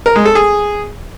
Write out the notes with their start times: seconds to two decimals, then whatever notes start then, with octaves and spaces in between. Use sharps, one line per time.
0.06 A#4
0.16 G#3
0.26 A4
0.35 G#4